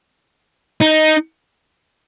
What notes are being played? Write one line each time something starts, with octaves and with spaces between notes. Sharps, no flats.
D#4